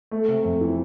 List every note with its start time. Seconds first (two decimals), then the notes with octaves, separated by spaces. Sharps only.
0.11 A3
0.28 C3
0.45 F2
0.61 E3